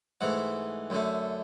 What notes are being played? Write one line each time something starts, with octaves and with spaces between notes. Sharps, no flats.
G#2 E3 A3 F#5
F#2 D3 A3